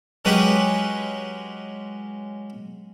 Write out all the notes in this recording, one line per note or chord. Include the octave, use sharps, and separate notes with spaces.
F#3 G#3 C#4 G4 G#4 B4